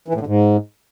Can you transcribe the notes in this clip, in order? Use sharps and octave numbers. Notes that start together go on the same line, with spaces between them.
E3
A2
D3
G#2